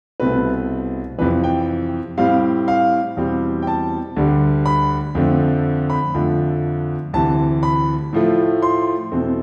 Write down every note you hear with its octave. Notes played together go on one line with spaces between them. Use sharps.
C2 B2 A3 C4 B4
F2 C3 E3 B4
G5
A2 G3 C4 F5
F5
E2 B2 G3 C4
G5
A5
D2 D3 G3
B5
F2 D3 A3 C4
B5
F2 D3 F3 A3
D2 C3 E3 A5
B5
A2 F3 A3
C6
E2 B2 A3 C4